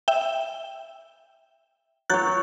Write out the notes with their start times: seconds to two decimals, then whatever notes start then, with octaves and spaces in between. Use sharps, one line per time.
0.08 E5 G5
2.10 F#3 C#5 F#6 G6 A6